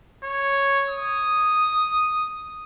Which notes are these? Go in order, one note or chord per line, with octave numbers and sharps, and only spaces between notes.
C#5
D#6